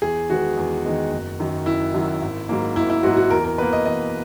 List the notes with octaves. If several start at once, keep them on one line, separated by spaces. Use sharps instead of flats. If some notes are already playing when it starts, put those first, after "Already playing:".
E2 G#4
D#3 G#3 B3 F#4
E2
D#3 G#3 B3
F#1
F#2 D#3 F#3
F#1 E4
F#2 D#3 F#3
G#1
G#2 F#3 A#3
G#1 E4
E4
G#2 F#3 A#3 F#4
F#4
E2 A#4
A#4
B2 A#3 B4
D#5
E2 D#5